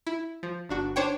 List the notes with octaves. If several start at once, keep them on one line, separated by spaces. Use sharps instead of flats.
E4
F3
G1 D4 F#4
D4 C5 C#5 G5